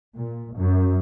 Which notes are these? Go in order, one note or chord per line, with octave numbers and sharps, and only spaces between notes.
A#2
F#2